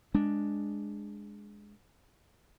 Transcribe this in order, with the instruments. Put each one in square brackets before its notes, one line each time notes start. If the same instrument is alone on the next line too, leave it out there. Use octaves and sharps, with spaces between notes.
[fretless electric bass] G#3 D4